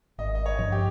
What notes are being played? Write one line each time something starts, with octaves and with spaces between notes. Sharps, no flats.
G#1 D#5
D#5
C#5
G2 F3
G4